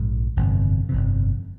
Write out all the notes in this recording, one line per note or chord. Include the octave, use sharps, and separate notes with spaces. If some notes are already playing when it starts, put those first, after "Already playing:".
Already playing: A#1 G#2
G1 F2 C3
G1 F2 C3